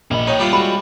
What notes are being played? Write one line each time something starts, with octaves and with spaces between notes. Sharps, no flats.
A#1 A#3 D#5 B5
D#4 C#5 G5
G3 E4 F4
G#3 F#4 B5 F7